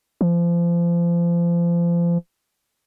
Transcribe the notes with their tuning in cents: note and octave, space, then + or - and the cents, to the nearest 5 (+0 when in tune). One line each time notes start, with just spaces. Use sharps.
F3 -30